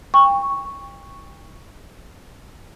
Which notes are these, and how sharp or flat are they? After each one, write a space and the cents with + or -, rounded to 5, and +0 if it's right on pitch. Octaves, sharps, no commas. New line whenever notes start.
G5 +35 C#6 +0